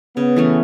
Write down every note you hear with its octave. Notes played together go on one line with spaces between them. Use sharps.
C#3 B3
E3 A3 C#4